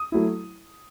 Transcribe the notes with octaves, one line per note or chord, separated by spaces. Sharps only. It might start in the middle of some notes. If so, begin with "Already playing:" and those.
Already playing: D#6
F#3 A3 E4